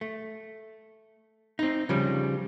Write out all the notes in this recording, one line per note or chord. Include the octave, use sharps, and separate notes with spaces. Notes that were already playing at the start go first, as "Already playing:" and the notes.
A3
C4 D#4
C#3 F3 G3